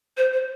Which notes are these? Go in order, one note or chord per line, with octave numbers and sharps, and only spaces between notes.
C5
C5